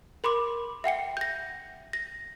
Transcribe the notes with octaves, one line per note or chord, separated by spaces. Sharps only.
A#4 B5 C6 D6
E5 F#5 G5 C#7
G6 A#6
A#6